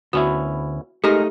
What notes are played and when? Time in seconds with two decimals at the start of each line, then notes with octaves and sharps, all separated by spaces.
0.13 D2 B3 C#4 E4 F#4
1.04 G#3 A3 D#4 G4 A#4